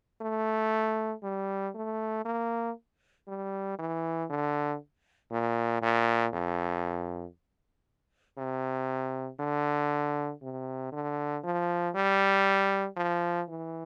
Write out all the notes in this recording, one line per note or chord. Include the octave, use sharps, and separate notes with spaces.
A3
G3
A3
A#3
G3
E3
D3
A#2
A#2
F2
C3
D3
C3
D3
F3
G3
F3
E3